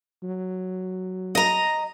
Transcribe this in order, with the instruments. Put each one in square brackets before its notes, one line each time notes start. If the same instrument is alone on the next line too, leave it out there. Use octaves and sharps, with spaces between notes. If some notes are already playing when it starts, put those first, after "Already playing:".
[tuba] F#3
[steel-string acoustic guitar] D#5 A#5